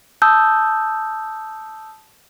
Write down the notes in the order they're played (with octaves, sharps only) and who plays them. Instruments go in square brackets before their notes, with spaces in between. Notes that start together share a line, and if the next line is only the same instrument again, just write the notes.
[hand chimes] A5 D#6 E6 G6